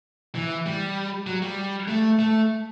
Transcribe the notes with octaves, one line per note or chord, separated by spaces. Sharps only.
E3
G3
F#3
G3
A3
A3